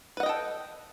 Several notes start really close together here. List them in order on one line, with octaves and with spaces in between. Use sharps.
B4 F#5 D#5 G5 A4